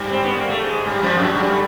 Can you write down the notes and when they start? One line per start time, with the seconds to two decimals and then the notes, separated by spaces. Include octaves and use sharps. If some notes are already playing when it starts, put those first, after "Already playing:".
Already playing: G2 G3
0.11 C4
0.23 B3
0.36 A#3
0.49 A3
0.62 G#2 G#3
0.85 G2 G3
1.02 F2 F3
1.18 F#2 F#3
1.34 G2 G3
1.48 A3